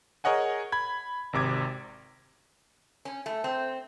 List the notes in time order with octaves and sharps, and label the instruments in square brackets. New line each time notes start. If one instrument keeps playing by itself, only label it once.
[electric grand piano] G#4 A#4 C#5 D#5 F#5 G#5
B5 G#6
G#1 C3 D6 G#6
[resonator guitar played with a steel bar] C#4
A3
C4